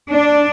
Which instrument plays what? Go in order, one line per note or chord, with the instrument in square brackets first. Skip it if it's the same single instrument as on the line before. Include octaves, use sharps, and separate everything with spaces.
[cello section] D4